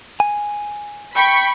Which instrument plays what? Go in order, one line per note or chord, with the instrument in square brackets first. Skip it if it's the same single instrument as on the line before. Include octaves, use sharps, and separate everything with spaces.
[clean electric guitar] G#5
[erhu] G5 [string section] B5 C#6